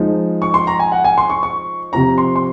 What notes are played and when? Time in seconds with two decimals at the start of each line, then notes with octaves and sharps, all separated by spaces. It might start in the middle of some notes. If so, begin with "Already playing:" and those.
Already playing: F3 G#3 D#4
0.42 C#6
0.54 C6
0.67 A#5
0.79 G#5
0.92 F#5
1.04 G#5
1.18 C6
1.30 C#6
1.43 C#6
1.92 C3 F3 C4 A#5
2.18 C6
2.36 C6